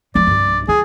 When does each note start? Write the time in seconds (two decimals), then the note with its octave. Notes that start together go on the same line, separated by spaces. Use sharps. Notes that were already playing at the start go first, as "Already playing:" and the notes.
0.15 F3 A3 D5
0.27 C2 G2
0.68 E4 G#4